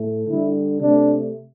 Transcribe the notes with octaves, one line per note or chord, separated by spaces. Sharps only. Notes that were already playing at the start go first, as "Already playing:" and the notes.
Already playing: A2 A3
D3 G3 E4
C3 A3 D4